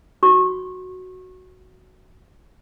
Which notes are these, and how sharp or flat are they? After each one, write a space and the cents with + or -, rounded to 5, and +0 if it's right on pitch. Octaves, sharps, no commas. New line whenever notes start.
F#4 +0 C#6 -25